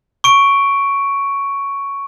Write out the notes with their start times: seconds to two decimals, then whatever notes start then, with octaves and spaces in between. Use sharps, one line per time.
0.24 C#6 D7